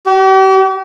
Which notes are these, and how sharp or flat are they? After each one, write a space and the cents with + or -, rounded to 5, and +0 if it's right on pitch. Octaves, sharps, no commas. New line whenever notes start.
G4 -40